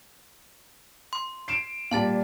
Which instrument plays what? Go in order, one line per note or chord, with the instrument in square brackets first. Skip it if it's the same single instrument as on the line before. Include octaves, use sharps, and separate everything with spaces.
[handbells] C6
[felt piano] C7 D7 E7
[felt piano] A#2 G3 [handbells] F5 A5 A6